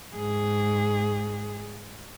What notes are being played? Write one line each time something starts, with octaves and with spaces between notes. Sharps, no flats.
G#2 G#4